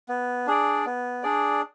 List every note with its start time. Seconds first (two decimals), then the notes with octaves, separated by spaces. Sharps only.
0.09 B3
0.47 D4 G#4 D5
0.86 B3
1.23 D4 G#4 D5